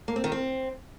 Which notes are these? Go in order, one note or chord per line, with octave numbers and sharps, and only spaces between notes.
A#3
C4
D#3
C4